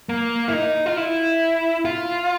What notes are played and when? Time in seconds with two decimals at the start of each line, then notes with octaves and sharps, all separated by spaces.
0.09 A#3
0.48 E4
0.53 D#4
0.86 F4
0.97 E4
1.85 F4